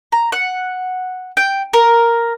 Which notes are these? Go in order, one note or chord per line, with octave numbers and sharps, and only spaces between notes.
A#5
F#5
G5
A#4